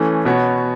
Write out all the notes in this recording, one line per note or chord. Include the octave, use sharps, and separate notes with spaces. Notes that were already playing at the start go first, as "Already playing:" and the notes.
Already playing: E3 A3 C#4
B2 B3 F#4 C#5